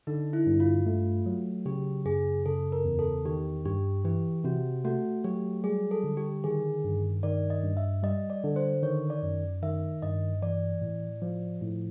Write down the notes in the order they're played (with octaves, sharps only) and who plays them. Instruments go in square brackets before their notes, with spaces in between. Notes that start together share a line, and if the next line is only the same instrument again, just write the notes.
[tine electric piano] D3 [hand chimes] D#4
[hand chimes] E4
[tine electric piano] G2
[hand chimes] F4
[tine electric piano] A3
F#3
[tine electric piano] C#3 [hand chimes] G4
[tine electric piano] F#2 [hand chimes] G#4
[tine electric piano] C#3 [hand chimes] A4
[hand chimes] A#4
[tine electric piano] E2
[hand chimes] A4
[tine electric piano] D#3 [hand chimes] G4
[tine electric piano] G2 [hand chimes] G4
[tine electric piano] E3 [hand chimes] G4
[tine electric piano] C3 [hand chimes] F#4
[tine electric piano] A3 [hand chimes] F#4
[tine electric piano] F#3 [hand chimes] G4
[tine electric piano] G3 [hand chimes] G#4
[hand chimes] A4
[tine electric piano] D3
[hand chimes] G4
[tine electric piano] D#3 [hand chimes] G#4
[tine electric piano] G2
[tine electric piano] D#3 [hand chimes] D5
[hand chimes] D#5
[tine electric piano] G2
[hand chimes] E5
[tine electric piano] G3 [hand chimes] D#5
[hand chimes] D5
[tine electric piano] D3
[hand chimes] C5
[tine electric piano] D#3 [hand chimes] C#5
[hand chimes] D5
[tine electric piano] F#2
[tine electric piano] D#3 [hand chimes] E5
[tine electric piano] G2 [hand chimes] D#5
[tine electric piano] E3 [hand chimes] D5
[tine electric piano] A2
F3
A2